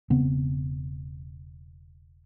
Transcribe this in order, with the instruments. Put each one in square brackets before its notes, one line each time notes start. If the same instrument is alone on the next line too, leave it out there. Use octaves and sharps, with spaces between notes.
[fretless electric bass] E1 C#3 B3 C4